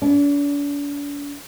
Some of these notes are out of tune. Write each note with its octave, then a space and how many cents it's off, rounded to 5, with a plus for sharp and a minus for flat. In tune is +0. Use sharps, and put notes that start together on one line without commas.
D4 -40